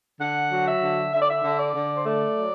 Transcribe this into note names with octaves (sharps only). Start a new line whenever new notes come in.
D3 F#5
F#3
E5
D3
D3 E5
D5
E5
D3
D5
D3
C5
A3 D5
F#3